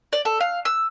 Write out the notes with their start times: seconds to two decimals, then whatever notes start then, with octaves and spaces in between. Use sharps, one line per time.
0.13 D5
0.25 A4
0.40 F5
0.65 E6